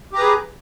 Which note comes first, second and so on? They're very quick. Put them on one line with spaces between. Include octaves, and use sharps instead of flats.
G4 A#5 B4 G#4